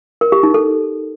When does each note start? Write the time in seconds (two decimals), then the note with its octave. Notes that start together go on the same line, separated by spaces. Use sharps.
0.21 A#4
0.32 G4
0.43 D#4
0.54 A4